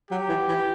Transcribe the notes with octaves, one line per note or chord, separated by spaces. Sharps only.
F#3 G4
E3
E3